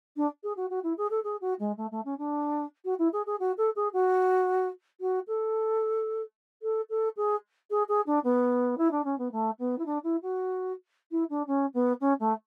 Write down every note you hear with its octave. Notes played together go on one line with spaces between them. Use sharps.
D4
G#4
F#4
F#4
E4
G#4
A4
G#4
F#4
G#3
A3
A3
C#4
D4
F#4
E4
G#4
G#4
F#4
A4
G#4
F#4
F#4
A4
A4
A4
G#4
G#4
G#4
D4
B3
E4
D4
C#4
B3
A3
B3
E4
D4
E4
F#4
E4
D4
C#4
B3
C#4
A3